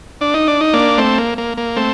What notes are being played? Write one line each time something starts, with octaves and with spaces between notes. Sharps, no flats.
D4
D#4
D4
D#4
A#3 D4
A3 C4
A#3
A#3
A#3
A3 C4